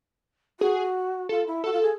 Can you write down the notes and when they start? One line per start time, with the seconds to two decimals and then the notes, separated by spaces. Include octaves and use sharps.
0.60 F#4 G#4
1.29 F4 A4
1.47 E4
1.64 F#4 A4
1.73 F4
1.82 G#4